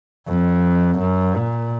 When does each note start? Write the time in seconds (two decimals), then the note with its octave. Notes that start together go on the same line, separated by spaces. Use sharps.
0.28 F2
0.99 F#2
1.35 A#2